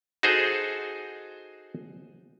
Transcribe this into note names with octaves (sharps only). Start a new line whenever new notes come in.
D#4 F#4 G#4 A4 C5